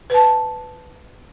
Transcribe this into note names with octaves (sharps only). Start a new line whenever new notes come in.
B4 A5